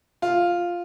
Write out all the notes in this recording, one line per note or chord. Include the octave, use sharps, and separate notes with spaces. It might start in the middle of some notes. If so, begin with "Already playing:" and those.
F4